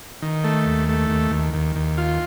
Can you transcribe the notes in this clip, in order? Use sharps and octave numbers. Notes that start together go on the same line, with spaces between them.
D#3
A3
D#2
A3
D#2
D#2
D#2
D#2
F4